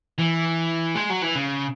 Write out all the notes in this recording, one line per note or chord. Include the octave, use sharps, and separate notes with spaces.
E3
G#3
F#3
E3
C#3